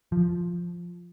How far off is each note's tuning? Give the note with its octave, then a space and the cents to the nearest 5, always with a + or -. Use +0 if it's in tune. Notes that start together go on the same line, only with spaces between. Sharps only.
F3 +0